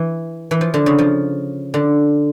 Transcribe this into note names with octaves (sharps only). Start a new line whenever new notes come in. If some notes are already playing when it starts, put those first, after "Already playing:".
Already playing: E3
E3
F3
D3
C#3
F3
D3